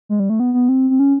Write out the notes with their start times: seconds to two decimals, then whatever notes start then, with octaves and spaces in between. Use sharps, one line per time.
0.09 G#3
0.20 G3
0.30 A3
0.40 B3
0.54 B3
0.69 C4
0.90 C4
0.99 C#4